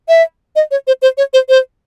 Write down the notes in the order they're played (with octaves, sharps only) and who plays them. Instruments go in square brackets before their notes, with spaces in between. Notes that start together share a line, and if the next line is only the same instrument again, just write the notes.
[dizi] E5
D#5
C#5
C5
C5
C#5
C5
C5